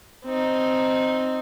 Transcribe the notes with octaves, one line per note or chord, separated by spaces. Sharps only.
C4 D#4